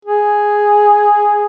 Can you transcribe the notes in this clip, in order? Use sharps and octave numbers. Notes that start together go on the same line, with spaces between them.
G#4